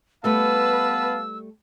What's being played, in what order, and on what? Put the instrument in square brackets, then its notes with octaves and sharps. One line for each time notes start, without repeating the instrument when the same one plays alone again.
[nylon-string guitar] G3 A3 E5 [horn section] B3 F5 A5 [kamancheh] B4 [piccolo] E6